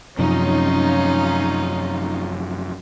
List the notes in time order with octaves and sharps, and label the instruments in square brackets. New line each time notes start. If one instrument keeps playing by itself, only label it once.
[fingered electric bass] F#2 C3 F3 [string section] C#4 D#4 F4